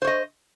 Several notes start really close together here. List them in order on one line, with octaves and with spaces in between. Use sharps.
C5 C#5 D#5